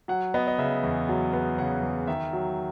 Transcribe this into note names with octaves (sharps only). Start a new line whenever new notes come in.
F#3 F#5
B3 D#5
D#5
C#3 E5
E2
F#3
B3
C#3 F#5
E2
D#3 E5
F#3